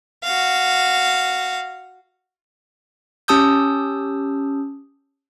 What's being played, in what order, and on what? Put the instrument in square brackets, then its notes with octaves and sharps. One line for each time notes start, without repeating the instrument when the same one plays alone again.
[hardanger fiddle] F#4 F5
[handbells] C#4 G4 A5 D#6 E6 G6